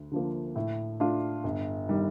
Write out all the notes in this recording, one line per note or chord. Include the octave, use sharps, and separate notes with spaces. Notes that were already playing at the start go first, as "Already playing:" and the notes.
Already playing: D2
D3 F3 A#3
A2
A3 D4 F4
G1
D#3 G3